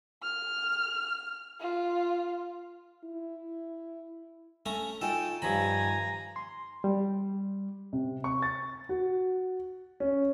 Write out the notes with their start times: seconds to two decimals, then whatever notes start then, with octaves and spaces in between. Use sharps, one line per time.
0.23 F6
1.60 F4
3.04 E4
4.66 A3 C#4 A#5
5.01 D#4 F4 A4 G5 G#5
5.42 G2 D#3 F3 C#5 G#5 A#5 B5
6.36 C6
6.84 G3
7.93 C3
8.24 C#6
8.42 A6
8.89 F#4
10.00 C#4